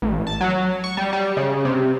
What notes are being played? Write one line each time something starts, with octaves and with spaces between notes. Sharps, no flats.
A1
A5
F#3
C#6
G3
G3
C#3
C3